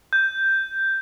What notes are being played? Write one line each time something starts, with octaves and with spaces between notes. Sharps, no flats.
G6